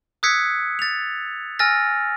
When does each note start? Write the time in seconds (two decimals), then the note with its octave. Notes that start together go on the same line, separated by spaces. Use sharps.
0.23 D#6 E6 F#6 G#6 B6 C#7
0.79 A6 F7
1.59 G#5 E6 F6 A6 A#6